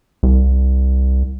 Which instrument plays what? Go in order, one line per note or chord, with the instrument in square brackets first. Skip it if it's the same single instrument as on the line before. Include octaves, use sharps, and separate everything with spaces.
[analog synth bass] C2